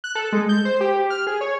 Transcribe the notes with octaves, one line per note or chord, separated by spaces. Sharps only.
F#6
A4
G#3
G6
C5
G4
F6
G#4
C#5